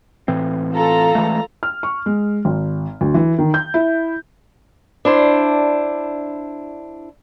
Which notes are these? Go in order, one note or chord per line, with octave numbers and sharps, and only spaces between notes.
A2 E3 C4
F4 A4 A#5
E3 G#3 A3
F6
C#6
G#3
G#1
D2
E3
D#3
G6
E4
D4 E4 C5